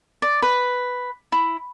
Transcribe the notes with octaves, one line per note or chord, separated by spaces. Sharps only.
D5
B4
E4